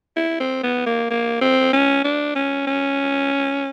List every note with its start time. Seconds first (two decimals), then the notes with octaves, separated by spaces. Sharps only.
0.16 E4
0.40 C4
0.63 B3
0.86 A#3
1.11 A#3
1.41 C4
1.73 C#4
2.04 D4
2.35 C#4
2.67 C#4